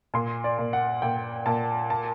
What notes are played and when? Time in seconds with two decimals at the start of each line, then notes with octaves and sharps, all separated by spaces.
0.14 A#2 C6
0.44 D5
0.59 A#2
0.73 F#5
1.02 A#2 G5
1.46 A#2 A5
1.90 A5